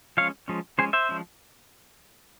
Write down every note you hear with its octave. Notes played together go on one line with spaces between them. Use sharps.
F3 G#3 C#4 C#5 F5
F3 G#3 C#4
F3 G#3 C#4 G#4 C5
C5 E5
F3 G#3 C#4